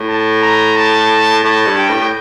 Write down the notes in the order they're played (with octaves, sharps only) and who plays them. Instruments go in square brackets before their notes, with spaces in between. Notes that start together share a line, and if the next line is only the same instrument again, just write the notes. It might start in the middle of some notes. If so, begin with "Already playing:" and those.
Already playing: [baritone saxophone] A2
[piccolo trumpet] A5
A#5
A5
[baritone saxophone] A2 [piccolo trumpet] A5
[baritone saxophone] G2
[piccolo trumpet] G5
[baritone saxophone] A2
A2